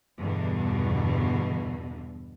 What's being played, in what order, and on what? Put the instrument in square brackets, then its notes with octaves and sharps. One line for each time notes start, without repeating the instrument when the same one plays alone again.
[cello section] E2 G2 B2 D3